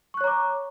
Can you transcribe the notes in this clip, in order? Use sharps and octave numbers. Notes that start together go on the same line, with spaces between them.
C#5 A#5 C#6 D6 F#6